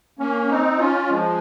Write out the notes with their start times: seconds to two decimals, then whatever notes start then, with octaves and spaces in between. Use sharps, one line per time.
0.19 A#3 C#4
0.49 C4 D#4
0.79 C#4 F4
1.09 F3 G#3